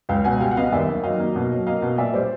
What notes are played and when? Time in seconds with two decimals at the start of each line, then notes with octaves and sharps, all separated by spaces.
0.09 C#2 F5 G5
0.24 B2 F#5 G#5
0.40 G3 F5 G5
0.51 F#5
0.57 B3 D#5 F5
0.72 D#2 D5 E5
0.88 D#3
1.03 F#3 D#5 F5
1.19 A#3
1.36 B2
1.51 F#3
1.66 A#3 D#5 F5
1.82 B2
1.98 A#2 D5 E5
2.14 G3 C5 D5